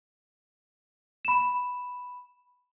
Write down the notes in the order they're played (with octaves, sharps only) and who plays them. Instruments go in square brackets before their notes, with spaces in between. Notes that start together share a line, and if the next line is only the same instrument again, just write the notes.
[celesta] B5 E7